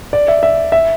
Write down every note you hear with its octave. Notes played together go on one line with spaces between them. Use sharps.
D5
E5
E5
E5